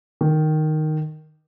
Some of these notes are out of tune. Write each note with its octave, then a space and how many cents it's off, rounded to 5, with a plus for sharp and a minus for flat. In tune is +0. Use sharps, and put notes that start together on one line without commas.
D#3 -5